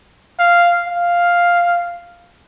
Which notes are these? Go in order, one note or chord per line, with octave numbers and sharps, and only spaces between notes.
F5
F5